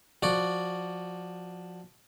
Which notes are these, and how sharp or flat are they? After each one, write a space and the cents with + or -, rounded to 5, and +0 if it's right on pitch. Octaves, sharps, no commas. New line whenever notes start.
F3 +15 F#4 +0 D5 +0